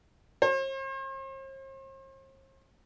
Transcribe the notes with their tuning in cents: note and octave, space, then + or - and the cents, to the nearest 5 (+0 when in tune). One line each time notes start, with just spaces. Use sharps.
C5 +45